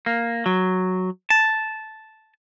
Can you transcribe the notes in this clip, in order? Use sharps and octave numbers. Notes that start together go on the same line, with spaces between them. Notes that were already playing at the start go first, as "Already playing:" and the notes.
A#3
F#3
A5